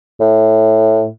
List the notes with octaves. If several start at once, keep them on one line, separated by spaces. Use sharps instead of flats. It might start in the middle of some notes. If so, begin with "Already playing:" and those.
A2